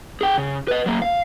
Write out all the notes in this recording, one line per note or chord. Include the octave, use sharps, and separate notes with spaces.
G#4 G5
C#3
B4 D#5
F#3 A#3
F5